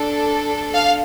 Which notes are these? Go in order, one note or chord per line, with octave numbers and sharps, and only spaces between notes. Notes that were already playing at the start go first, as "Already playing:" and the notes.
Already playing: D4 A4
F5